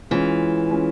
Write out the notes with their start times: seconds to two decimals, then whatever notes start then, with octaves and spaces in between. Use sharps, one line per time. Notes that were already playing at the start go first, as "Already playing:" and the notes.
0.11 E3 G#3 C#4 F4
0.71 G#3 C#4 F4